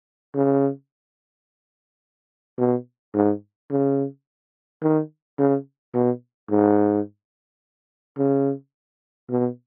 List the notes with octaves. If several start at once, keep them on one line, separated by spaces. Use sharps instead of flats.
C#3
B2
G#2
C#3
D#3
C#3
B2
G#2
C#3
B2